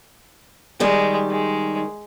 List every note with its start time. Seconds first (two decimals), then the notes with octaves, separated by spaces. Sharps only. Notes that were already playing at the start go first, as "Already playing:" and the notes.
0.80 D#3 G3 G#3 G4
1.30 G#3